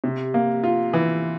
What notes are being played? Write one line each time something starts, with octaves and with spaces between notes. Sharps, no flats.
C3
A#3
F4
E3